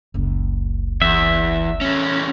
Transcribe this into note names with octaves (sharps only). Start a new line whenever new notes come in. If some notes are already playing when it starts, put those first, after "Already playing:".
F#1 C#2
E2 E5
E2 C#4